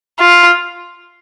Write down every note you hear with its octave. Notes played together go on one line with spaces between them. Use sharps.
F4